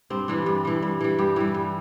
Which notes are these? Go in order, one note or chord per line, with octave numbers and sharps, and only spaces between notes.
G2 C4
E3 G3 D4
G2
E3 G3
G2
E3 G3
G2 G4
E3 G3
G2